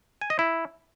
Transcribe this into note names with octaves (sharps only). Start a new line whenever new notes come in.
G#5
D#5
E4